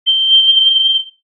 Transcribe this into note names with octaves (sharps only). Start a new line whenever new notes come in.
G7